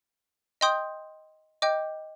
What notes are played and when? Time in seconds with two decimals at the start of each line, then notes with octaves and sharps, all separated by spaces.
0.61 D#5 G5 C6 D#6 G6
1.62 D#5 G5 D6 G6